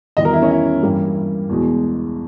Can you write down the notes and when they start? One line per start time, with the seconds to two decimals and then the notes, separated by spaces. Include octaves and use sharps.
0.17 E2 D#3 G3 D#5
0.25 A#4
0.33 E4
0.42 C#4
0.50 E4
0.83 G2 E3 G3 A#3
1.49 E2 B2 G#3